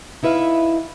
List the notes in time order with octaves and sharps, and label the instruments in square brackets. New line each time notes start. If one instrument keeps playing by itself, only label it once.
[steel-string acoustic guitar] D#4 E4 B4 E5 F5